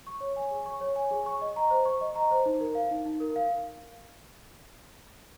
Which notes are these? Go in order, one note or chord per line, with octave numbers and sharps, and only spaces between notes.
C#6
C#5
G#5
G#4
C#6
C#5
G#5
G#4
C#6
D#5
A#5
C5
C#6
D#5
A#5
C5
D#4
A#4
F5
D#4
D#4
A#4
F5